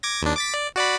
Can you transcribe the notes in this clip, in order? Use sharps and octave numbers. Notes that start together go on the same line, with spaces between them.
D6 G#6 A#6
D#2 D4
D6 A6 B6
D5
F#4 D5 B5